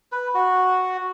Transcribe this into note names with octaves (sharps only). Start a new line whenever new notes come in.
B4
F#4